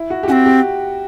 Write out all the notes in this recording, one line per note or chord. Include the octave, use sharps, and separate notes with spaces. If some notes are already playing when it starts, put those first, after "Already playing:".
Already playing: E4
F#4
G4
C4 C#4 F#4
G4